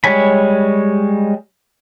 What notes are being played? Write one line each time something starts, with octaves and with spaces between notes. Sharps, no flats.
G3 G#3 C#5 G#5 B5